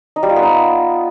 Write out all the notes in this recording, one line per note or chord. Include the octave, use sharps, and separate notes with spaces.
D#4
G3
F4
B3
D#4